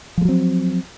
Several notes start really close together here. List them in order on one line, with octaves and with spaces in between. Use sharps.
F3 G#3 F#3 C4